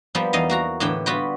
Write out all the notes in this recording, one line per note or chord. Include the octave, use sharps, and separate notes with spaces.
F3 G3 A#3 B3
E2 D#4 D#5 F5
A#3 F#4 A#5
A2 D3 E3 G4 G5
G3 B3 F4 F#4 B4 G5